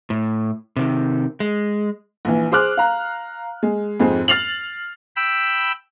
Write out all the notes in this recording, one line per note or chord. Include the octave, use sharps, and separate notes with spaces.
A2
C3 D#3
G#3
A#1 E3
G#4 C5 D6 F6 F#6
F5 A#5
G#3
F2 G#2 G#3 C4
F6 A6 C7 F7 F#7
G5 B5 E6